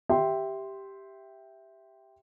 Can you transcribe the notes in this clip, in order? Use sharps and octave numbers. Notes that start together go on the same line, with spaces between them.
G4 E5 G5 C6